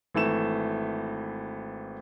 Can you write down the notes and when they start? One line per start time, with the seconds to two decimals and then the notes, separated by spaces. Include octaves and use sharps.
0.14 G#1 E3 A3 E7